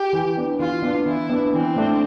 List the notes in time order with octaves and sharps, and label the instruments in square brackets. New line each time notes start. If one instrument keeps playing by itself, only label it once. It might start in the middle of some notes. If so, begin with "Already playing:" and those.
Already playing: [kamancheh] G4
[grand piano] E3
B3 D4
[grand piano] E3 [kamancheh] F4
[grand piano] B3 D4
[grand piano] E3 [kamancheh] E4
[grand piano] B3 D4
[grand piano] E3 [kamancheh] C4
[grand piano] A3 D4